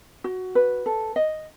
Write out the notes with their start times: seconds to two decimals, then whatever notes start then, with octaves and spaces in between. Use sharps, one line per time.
0.24 F#4
0.55 B4
0.86 A4
1.16 D#5